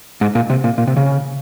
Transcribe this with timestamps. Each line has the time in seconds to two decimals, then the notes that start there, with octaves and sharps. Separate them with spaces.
0.21 G#2
0.35 A#2
0.50 C3
0.64 A#2
0.78 A#2
0.87 C3
0.97 C#3